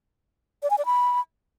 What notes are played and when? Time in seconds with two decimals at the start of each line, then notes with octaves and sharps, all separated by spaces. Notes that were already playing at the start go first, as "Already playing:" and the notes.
0.63 D5
0.70 G#5
0.78 D5
0.86 B5